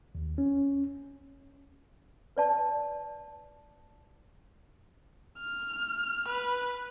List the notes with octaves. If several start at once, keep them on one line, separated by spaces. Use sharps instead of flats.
D#2
C#4
B4 D5 A5
F6
B4